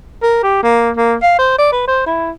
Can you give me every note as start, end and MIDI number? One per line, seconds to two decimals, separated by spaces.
0.22 0.40 70
0.43 0.58 67
0.63 0.91 58
0.97 1.16 58
1.22 1.36 77
1.39 1.54 72
1.58 1.70 74
1.72 1.85 71
1.87 2.03 72
2.06 2.31 64